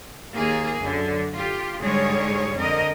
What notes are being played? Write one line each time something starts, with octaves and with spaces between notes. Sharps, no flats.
D#2 A#3 G#4
F#2 D3
F4 G4
G#2 D3 G3 G#3 G#4 C#5
F2 D3 A#4 D#5